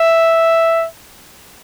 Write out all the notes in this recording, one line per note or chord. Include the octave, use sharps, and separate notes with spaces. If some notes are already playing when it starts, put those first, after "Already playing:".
Already playing: E5